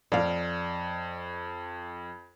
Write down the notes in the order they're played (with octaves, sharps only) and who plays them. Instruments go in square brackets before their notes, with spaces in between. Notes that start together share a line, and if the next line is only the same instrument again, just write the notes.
[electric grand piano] F2 [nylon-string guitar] D5 F5